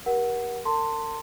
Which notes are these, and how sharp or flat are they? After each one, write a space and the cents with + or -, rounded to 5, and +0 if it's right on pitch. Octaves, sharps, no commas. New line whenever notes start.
G4 +0 A#4 +35 F#5 +0
A#4 -45 A5 +25 C6 +0